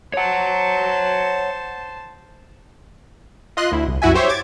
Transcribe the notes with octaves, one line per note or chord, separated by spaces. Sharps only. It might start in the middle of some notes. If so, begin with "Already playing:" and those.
C5 C#5 F#5 A5
F4 D#5 C6 F#6
D2 E4
C2
C2 F#2 E4 F#4 E5 G#5
G4 C5 C#5 E5
D6 G#6 A6